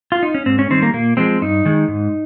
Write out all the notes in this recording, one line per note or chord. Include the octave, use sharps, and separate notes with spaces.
F4
D#4
C#4
G#2 C4
C#4
D#3 G3 C4
A#3
A#2 A#3
F3 G#3 C4
G2 D#4
D#3 G#3
G#2